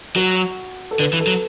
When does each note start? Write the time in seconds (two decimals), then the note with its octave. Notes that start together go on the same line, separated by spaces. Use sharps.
0.16 F#3 F#4
0.91 A4
0.99 D3 B4
1.13 E3
1.20 A4
1.27 F#3